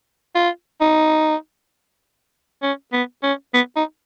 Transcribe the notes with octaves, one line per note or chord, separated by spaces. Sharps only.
F4
D#4
C#4
B3
C#4
B3
D#4